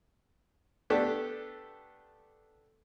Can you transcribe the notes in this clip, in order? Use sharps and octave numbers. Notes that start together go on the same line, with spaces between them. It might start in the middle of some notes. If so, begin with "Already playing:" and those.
A3 B3 D4 G4 A4